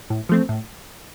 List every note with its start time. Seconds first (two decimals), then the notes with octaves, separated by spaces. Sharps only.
0.10 A2
0.29 F3 A3 C4
0.49 A2